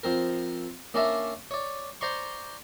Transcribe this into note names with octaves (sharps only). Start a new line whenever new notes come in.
F3 C4 A#4
A#3 C#4 D4 A#4 D5 E5
C#5 D5
C5 D5 A#5 C6 C#6